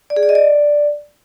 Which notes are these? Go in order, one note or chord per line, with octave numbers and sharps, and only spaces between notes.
D5
G#4
D5
D#5
D5